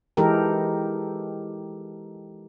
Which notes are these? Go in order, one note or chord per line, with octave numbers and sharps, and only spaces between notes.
E3 G#3 D#4 G4 A4 A#4